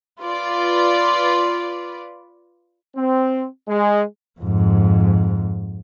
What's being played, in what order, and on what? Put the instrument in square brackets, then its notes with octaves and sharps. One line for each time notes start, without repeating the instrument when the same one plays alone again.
[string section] F4 B4 D5
[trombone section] C4
G#3
[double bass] F2 G#2